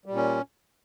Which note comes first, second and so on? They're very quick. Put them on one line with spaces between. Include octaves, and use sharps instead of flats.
G3 A#2 C#4